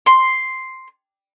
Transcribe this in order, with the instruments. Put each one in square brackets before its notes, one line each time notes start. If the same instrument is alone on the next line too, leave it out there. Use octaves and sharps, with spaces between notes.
[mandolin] C6